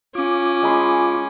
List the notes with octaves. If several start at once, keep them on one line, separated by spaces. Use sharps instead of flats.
C#4 F4 D6
G#3 B5 C6